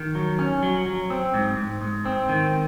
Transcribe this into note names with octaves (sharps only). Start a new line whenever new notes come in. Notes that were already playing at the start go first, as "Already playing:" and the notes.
Already playing: D#3
F#3
C#4
F#3
F#3
C4
G#2
G#2
G#2
C4
D#3